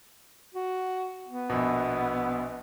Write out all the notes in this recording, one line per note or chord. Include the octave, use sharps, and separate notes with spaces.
F#4
B3
A#1 B2